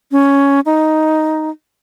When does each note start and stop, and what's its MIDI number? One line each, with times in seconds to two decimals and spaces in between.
0.12 0.60 61
0.66 1.50 63